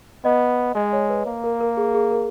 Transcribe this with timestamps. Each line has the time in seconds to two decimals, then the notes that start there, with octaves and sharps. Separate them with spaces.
0.25 B3 D#5
0.75 G#3 D#5
0.93 C#5
1.09 B4
1.26 A#3
1.44 A#4
1.60 A#4
1.77 G#4
1.94 G#4
2.11 A#4